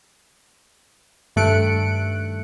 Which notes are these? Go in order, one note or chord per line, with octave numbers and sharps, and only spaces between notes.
G2 D#3 A3 F#6 C#7 D7